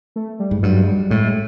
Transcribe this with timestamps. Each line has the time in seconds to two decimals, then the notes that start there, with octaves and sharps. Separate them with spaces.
0.16 A3
0.39 G3
0.51 G#2
0.63 G2 F#3
0.83 G#3
0.87 G3
1.11 A2 G#3